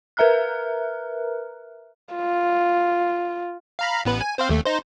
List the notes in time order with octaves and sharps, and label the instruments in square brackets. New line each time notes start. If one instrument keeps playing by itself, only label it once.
[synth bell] A#4 B4 E5 A#5 F6 F#6
[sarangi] F4
[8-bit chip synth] F5 A#5 B5
A1 B3 B4
G#5
C4 C5 F5
D#2 A3
D#4 C5